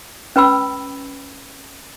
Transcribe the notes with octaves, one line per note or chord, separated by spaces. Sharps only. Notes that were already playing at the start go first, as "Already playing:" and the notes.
C#4 B4 G5 B5 E6